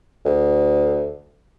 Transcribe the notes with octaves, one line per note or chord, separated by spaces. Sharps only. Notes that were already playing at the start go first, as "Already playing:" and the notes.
D2